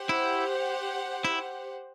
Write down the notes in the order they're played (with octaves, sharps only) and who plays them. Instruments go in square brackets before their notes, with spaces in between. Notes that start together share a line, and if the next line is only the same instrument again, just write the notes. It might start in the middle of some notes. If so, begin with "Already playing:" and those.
Already playing: [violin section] G4 C5 F#5
[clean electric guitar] E4
E4